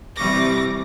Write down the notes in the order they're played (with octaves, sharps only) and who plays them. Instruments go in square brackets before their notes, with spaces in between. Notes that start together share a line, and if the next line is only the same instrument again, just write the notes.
[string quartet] C3 E3 G3 C#6 D6 A#6